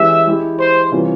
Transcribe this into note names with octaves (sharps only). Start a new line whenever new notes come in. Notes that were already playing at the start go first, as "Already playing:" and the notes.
Already playing: E3 G#3 C#4 G4 E5
G#3 E4 G4
C5
C3 E3 G3 C#4 F4